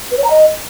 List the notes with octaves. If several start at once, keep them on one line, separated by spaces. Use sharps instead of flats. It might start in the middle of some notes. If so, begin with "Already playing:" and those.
B4
C#5
A#5
D#5